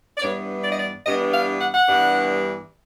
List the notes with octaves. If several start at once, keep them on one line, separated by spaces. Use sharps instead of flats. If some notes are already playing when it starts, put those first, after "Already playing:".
D5
G2 E3 G3 B3 D4 C#5
D5
D#5
D5
G2 E3 G3 B3 D4 D#5
F5
F#5
F#5
G2 E3 G3 B3 D4